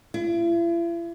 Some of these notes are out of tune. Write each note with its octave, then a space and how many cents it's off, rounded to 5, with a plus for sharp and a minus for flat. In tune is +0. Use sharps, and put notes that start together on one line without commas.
E4 +45